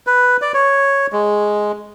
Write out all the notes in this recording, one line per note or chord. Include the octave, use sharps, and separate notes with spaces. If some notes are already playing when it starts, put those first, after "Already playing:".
B4
D5
C#5
G#3